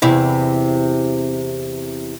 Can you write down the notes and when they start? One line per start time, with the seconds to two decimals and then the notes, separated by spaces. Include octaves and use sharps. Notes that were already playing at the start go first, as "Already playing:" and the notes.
0.02 E2 C3 E4